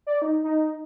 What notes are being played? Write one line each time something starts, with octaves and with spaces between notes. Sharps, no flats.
D5
D#4
D#4